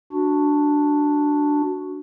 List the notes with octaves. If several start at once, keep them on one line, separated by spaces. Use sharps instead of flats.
D4 F#4